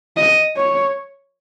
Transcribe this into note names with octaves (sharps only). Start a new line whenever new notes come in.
D#5
C#5